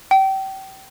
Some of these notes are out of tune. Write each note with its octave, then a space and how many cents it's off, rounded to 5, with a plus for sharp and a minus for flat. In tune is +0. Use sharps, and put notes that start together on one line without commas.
G5 -30